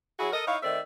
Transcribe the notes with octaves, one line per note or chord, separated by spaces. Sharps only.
F#3 E4 F#4 G#4
A4 A#4 D#5
D#4 E4 C#5 F5
D#3 A3 C4 D5 E5